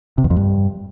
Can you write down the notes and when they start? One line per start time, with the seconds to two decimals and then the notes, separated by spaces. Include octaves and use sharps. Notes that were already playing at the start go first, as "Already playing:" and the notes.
0.18 C3
0.24 E2
0.30 F2
0.37 G2